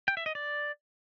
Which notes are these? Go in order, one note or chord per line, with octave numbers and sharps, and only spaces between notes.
G5
E5
D#5
D5